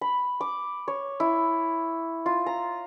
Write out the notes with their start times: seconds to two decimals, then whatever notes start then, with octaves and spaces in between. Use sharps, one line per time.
0.01 B5
0.41 D6
0.88 C#5
1.20 E4
2.26 F4
2.46 A#5